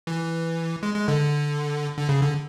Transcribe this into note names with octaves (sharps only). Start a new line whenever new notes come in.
E3
G#3
G#3
D3
D3
C#3
D3